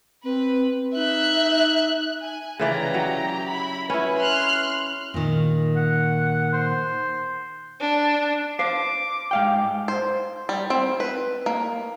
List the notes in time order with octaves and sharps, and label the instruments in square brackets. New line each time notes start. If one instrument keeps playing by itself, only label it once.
[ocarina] C4 [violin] B4
[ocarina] D#4 [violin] E5 F#6
[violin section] G#5
[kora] C#3 E3 D5 [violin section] G4 A#5
[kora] F#3
[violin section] E4 B5
[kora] C#4 E4 [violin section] F#4 B4
[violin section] C6 F6 F#6
[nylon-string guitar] A#2 D#3
[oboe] F#5
C5
[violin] D4
[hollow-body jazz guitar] C5 F5 [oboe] D6
[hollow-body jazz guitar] G#2 F5 G5
[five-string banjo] C5
G3
C4
B4
A#3